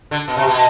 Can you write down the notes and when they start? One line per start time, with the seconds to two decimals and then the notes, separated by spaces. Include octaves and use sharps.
0.11 D3
0.28 B2
0.37 C3
0.47 B2